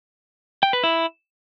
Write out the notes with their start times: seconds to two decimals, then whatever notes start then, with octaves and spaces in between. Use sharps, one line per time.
0.63 G5
0.73 B4
0.84 E4